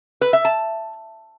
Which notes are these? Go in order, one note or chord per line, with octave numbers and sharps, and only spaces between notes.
B4
E5
A5